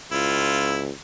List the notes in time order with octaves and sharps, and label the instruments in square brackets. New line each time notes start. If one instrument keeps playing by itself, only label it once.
[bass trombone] C#2 [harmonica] E4 F4